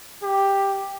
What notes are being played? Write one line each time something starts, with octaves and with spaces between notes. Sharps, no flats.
G4